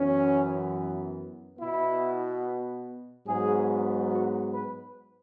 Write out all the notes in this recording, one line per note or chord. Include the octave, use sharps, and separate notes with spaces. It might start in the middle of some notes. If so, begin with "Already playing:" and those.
Already playing: F#2 E3 B3 C#4
B2 B3 E4
G#2 F#3 B3 G#4
F#4
B4